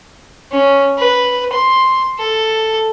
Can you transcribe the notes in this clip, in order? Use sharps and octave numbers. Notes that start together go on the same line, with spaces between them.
C#4
B4
C6
A4